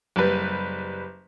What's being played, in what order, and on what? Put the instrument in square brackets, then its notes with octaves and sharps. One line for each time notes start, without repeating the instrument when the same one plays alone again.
[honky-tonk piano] F#1 G3 B4